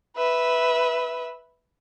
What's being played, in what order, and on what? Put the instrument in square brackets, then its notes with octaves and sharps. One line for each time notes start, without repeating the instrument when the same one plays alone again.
[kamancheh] B4 E5